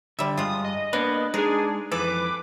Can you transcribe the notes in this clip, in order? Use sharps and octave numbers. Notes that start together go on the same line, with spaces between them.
D3 G3 E5
G2 G#3 F4 D#6
D#5
A#3 B3 D4 B4
G#3 D4 D#4 G#4
F2 E3 A4 B4 D6